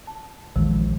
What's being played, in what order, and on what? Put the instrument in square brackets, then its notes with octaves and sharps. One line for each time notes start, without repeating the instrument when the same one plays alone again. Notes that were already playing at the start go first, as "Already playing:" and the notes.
[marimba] A5
[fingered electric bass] A#1 E2 [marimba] D#3 F3 G#3